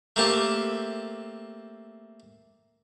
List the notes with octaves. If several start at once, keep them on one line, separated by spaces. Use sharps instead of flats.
A3 A#3 C4 G4 A5